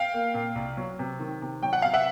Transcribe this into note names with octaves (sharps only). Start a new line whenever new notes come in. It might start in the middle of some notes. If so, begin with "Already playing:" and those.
Already playing: F5 G5
A#3
A#2
C2
F#3
C3
D#3
C3
F#3 G5
F#5
C3 F5
E5 F#5